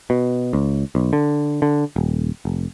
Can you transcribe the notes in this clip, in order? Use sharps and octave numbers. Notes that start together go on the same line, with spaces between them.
B2
C#2
B1
D3
D3
D#1
F1